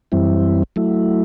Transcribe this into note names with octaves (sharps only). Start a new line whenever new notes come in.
F#2 E3 G3 C4 E4
F#3 A3 E4